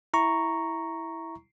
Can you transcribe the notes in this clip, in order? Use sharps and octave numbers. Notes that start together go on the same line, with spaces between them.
E4 A#5 C#6